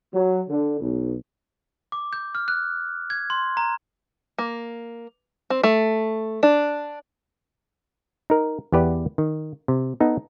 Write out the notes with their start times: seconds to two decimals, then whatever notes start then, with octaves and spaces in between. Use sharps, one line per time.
0.13 F#3
0.49 D3
0.81 B1
1.92 D6
2.13 G6
2.35 F6
2.48 F#6
3.10 G#6
3.30 C6
3.57 A#5
4.38 A#3
5.50 C4
5.63 A3
6.43 D4
8.30 D#4 A#4
8.72 E2 B3 G4 B4 D5
9.18 D#3
9.68 C3
10.00 B3 D#4 A4